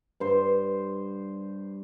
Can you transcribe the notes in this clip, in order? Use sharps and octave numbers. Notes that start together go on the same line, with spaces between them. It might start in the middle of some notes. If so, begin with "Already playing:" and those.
G2 C5